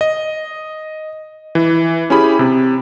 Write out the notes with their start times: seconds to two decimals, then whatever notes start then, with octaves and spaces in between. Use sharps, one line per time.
0.01 D#5
1.55 E3
2.10 C#4 E4 G4 G#4 B5
2.39 C3